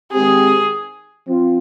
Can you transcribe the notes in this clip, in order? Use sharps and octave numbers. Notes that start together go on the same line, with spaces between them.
D#3 G#3 C4 G4 G#4
F3 C4 F4